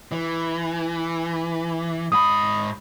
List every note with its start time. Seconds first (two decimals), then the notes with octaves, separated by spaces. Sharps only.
0.12 E3
2.12 G#2 B5 D#6